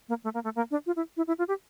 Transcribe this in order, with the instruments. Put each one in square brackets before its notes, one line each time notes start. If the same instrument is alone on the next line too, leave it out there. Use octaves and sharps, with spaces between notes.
[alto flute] A#3
A3
A#3
A3
A#3
D4
F4
E4
E4
E4
F4
G4